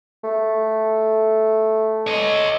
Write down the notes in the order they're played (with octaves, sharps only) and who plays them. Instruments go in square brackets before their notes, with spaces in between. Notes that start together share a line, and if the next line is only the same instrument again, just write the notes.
[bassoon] A3
[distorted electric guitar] C#5 D#5